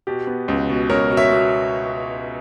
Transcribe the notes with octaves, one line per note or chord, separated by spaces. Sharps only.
B2 G4
B3
C#2
B2
C#2 A#4 C#5
B2
C#5 E5
B2